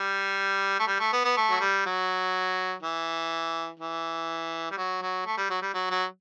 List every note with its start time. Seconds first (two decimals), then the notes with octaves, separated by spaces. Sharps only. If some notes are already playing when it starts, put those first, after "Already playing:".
Already playing: G3
0.80 A3
0.87 G3
1.00 A3
1.13 B3
1.25 B3
1.37 A3
1.50 F#3
1.60 G3
1.86 F#3
2.82 E3
3.80 E3
4.71 G3
4.77 F#3
5.02 F#3
5.26 A3
5.37 G3
5.50 F#3
5.62 G3
5.74 F#3
5.90 F#3